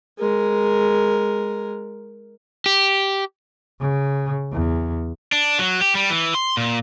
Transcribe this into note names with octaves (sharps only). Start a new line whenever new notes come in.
G#3 A#4
G4
C#3
E2
D4
F#3
G4
G3
E3
C6
A#2